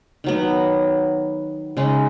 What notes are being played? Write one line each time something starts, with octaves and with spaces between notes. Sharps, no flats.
D#3 F#3 B3
C#3 G#3 D#4